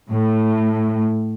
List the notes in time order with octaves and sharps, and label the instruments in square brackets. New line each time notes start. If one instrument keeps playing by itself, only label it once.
[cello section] A2